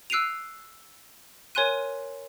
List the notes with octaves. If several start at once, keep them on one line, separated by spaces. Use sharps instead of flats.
E6 F#6 C7 D7 D#7 F7
A#4 C#5 G#5 C6 F#6 D#7